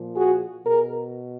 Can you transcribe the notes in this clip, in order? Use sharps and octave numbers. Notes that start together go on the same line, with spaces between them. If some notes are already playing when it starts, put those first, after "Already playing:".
Already playing: A#2 F3
F#4 G#4
B2 G#4 A#4